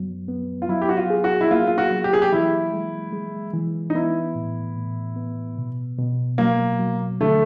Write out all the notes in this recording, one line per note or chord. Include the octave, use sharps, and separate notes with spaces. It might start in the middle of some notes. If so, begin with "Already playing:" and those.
Already playing: F#2 F#3 B3
B3
F4
F#3 E4
G4
F#4
F4
G#4
F#4
E4
A#3 F4
F4
F#4
F#3
G4
G#4
G4
E3 E4
G#3
G#3
E3
D#4
B3 E4
A2
A2
B3
B2
B2
F#3 A#3
F#3
D3 A3